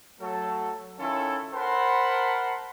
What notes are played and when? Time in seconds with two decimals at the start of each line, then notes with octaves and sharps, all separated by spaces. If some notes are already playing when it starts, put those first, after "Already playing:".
0.21 F#3 A3 A4
0.99 D#3 C#4 E4 F4 A4
1.53 A#4 C5 F#5 A5 B5 C6